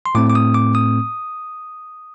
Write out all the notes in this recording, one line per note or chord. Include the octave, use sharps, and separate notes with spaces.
C6
A2 A3 C4 D6
D6
D#6
D6
D#6